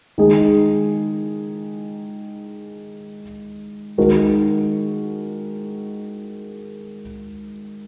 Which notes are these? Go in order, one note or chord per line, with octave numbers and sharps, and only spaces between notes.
D#3 G#3 D#4 G#4
D#3 G#3 F#4 A#4